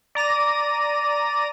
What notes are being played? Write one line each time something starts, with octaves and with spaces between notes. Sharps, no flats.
D5 A#5 A#6 D#7